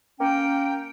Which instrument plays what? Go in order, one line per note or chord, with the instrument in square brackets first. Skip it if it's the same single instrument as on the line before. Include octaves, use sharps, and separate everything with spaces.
[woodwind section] A#3 C#4 G5